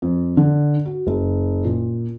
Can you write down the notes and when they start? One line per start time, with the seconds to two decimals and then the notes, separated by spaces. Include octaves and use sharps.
0.02 F2
0.37 D3
0.85 F#4
1.07 F#1
1.64 A#2